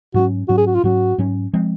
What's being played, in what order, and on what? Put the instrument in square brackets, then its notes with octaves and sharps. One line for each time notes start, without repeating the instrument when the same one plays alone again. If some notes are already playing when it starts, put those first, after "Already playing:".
[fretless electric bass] G#2 F#3 C#4 [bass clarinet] F#4
[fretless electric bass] G#2 F#3 C#4 [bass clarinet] F#4
[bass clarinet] G#4
F#4
F4
[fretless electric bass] G#2 F#3 C#4 [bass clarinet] F#4
[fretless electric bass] G#2 F#3 C#4
F3 G#3 C4